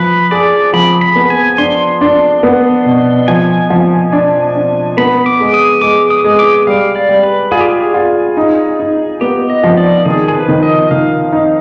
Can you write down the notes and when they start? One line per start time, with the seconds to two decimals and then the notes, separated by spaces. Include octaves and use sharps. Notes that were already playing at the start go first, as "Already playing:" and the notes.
Already playing: F3 B4
0.31 G#4 D5
0.73 F3 B5
1.01 B5
1.16 B3
1.30 G#5
1.58 D4 C6
2.01 D4
2.43 B3
2.86 B2
3.28 F3 G#5
3.70 F3
4.13 D4
4.55 D4
4.97 B3 B5
5.26 D6
5.40 G#3
5.54 D#6
5.82 G#3 D6
6.10 D#6
6.24 G#3
6.39 D6
6.67 G3 F5
6.96 D5
7.09 G3
7.23 B4
7.51 F4 G#4
7.61 G4
7.69 G#4
7.94 F4
8.37 D#4
8.79 D#4
9.21 B3 G4
9.50 D#5
9.63 F3
9.77 D5
10.06 D#3 G#4
10.28 G#4
10.34 B4
10.48 D#3
10.63 D#5
10.91 D#3 F5
11.32 D#4